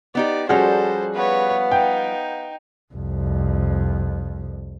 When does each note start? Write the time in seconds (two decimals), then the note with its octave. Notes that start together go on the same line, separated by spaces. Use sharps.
0.15 B3 D#4 G4 D5
0.49 F3 G3 C#4 F#4 G#4 A4 C5
1.15 B3 B4 C#5 F5
1.71 D#4 G5
2.94 C2 F2